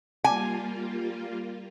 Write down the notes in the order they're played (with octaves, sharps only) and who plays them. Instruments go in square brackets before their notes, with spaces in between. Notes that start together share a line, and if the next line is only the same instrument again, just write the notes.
[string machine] G3 A#3 F4 [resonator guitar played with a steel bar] G#5